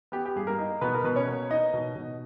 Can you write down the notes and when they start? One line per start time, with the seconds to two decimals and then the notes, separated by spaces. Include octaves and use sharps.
0.12 B3 G4
0.25 G4
0.36 G2 G#4
0.47 A#3 A#4
0.59 D#4
0.81 B2 B3 B4
0.94 A#4
1.04 B2 B4
1.16 C#4 C#5
1.27 A#3
1.51 D#4 D#5
1.73 B2
1.96 B2